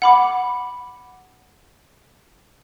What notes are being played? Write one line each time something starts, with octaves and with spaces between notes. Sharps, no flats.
F#5 B5 D6